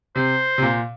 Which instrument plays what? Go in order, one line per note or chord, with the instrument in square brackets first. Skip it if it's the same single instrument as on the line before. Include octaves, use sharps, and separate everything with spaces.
[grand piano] C3 [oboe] C5
[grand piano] C3
A#2